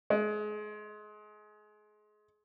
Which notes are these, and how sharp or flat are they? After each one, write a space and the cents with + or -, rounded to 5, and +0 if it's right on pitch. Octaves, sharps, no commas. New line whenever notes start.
G#3 +25